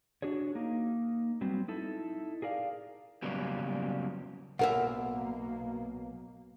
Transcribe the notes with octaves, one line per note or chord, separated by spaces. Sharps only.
D4 F#4 G#4 C#5
A#3 D#4
F#3 G3 B3 C4
D#4 E4 A4
G#4 A#4 D5 F5
C#3 F#3 G3 A#3 B3
B1 B2 A#3 A#4 E5 F#5